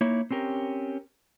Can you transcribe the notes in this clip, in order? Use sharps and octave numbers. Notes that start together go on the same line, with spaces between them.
A#3 D#4 E4 C#5
C4 C#4 G4 A#4